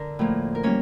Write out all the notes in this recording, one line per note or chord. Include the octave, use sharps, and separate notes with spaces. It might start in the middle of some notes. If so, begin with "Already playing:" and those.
Already playing: D3 A#4
A2 F3 A#3
A#4
G3 A#3 C#4 C#5